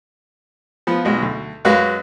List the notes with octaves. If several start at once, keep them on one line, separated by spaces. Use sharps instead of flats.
F3 B3
B1 G#3 F#4
D2
F#2 G#3 F#4 B4 F5